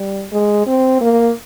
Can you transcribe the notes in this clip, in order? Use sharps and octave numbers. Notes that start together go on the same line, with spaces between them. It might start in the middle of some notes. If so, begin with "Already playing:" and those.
Already playing: G3
G#3
C4
A#3